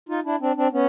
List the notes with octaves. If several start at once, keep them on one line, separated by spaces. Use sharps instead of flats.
D#4 F4
D4 E4
C4 D4
C4 D4
B3 C#4